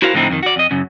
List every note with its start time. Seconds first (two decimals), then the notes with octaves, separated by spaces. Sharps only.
0.02 E4 F#4 A#4 C5 F5
0.14 A2 D3 F3 C4 D#4 E4
0.30 F2 D#3
0.43 F#4 D5
0.56 F2 D#5
0.71 F#2 C#3